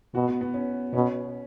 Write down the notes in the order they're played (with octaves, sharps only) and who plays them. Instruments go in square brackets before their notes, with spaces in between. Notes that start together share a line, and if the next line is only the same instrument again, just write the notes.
[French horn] B2 [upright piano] F#4
[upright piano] B3
B3
C#4
[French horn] B2 [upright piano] C#4